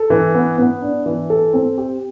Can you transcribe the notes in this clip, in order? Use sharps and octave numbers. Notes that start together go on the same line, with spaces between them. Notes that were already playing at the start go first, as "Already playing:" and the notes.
Already playing: A4
E3
B3
B3
D4
E3
A4
C4
G4